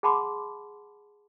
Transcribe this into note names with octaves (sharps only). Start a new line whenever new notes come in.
G#4 F#5 A5 B5 C6 D6